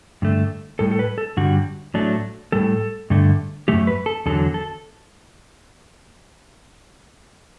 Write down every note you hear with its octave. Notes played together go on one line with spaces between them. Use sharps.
G2 D3 A3
A2 G3 A4
A4
B4
A4
G2 D3 G3 F#4
A2 F#3 A3 D4
A2 G3 A4
G2 D3 A3
F#2 E3 A3 G4
B4
A4
E2 D3 F#3 A4
A4